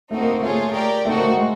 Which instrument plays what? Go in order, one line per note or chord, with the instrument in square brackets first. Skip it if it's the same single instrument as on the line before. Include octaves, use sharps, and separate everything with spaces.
[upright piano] A3 [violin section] C4 D#4 F#4
[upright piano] A#3
A#3
[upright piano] A3 [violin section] F4 G#4 C#5
[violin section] G4 A#4 D5 G5
[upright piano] A3 [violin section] C4 D#4 F#4
[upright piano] A#3
A3
G#3